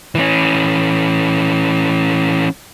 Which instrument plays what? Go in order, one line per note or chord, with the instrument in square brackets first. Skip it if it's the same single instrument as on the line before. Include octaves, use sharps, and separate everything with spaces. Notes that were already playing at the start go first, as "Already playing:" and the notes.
[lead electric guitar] E3 C#4